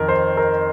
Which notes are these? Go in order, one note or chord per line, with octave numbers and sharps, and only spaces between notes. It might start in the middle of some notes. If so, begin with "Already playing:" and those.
Already playing: F2 D#3 A#4
C5
A#4